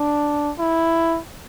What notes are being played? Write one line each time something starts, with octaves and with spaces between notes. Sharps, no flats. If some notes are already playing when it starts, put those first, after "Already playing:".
Already playing: D4
E4